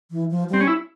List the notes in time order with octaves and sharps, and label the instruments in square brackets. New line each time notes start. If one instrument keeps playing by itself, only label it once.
[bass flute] E3
F3
[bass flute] G3 [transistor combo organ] C4
[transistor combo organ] C#4
E4